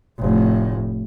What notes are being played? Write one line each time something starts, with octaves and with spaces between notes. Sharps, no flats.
F1 A2